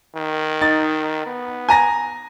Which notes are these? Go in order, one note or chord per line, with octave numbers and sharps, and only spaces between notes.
D#3
D#4 A6
B3
G#5 A#5 A#6